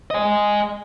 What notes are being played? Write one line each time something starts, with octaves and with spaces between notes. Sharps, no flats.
D#5 G#5